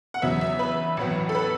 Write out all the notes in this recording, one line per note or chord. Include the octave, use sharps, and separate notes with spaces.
F#5
E2 C#3 F#3 B3 E5
E5
B4
A1 A2 F#3 B3
A4
B4